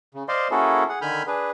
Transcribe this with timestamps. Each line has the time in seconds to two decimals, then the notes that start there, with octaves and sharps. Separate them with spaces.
0.15 C#3
0.29 C5 D5 D#5 F5 C6
0.51 A#3 C#4 E4 F#4 G#4 A4
0.89 G#4 F#5
1.02 D3 D#3 G#5 B5 F6 G6
1.27 D4 G#4 B4